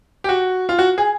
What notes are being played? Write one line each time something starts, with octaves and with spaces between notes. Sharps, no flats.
G4
F#4
F4
F#4
G#4